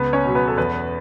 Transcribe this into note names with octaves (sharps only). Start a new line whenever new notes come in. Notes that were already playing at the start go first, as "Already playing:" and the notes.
Already playing: C#2 B3 B4
C#4 C#5
B2 F#3
B3 B4
A4
E2 B3 B4